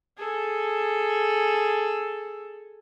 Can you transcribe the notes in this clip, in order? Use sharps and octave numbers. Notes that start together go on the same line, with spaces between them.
G#4 A4